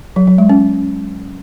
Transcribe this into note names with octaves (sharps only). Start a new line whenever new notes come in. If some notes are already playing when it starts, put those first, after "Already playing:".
F#3
F#3
G#3
C#4